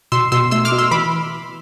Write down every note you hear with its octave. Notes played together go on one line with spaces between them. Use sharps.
B2 C6 E6
B2 C6 E6
A3 C6 E6
D6 F6
B2
C6 E6
E3 B5 D6